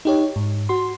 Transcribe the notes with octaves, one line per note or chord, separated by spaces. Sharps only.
D#4 G4 C#5
G#2
F#4 C6